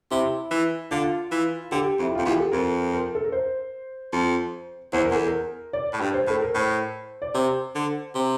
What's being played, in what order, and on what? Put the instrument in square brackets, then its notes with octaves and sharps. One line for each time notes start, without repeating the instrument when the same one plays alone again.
[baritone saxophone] C3 [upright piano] E4
[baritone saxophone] E3
[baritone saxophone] D3 [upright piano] F4
[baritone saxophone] E3
[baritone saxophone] D3 [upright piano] G4
[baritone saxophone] F2
[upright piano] E4
[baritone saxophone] F2 [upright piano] F4
[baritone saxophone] E2 [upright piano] G4
[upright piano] A4
[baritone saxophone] F2 [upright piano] A#4
[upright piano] A#4
A4
A#4
C5
[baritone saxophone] F2
[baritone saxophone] E2 [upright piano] C5
[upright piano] A#4
[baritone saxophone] E2 [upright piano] A4
[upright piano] A#4
D5
[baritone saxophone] A2
G2
[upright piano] C5
[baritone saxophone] A2 [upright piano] A4
[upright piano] A#4
[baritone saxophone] A2 [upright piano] C5
[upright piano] D5
[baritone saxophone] C3 [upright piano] C5
[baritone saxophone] D3
C3